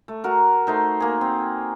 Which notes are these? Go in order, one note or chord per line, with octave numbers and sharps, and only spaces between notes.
A3
F#4 A#4
A3 D#4 C5
A#3 G#4
C4